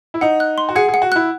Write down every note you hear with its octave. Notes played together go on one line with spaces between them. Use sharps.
E4
D#4 F#5
F#6
C6
F#4
G#4 F#5
G#4
F#5
F#4
E4 F#6